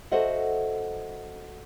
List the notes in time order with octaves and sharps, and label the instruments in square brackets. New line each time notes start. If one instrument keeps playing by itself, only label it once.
[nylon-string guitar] F#4 A4 C5 D#5 E5 F#5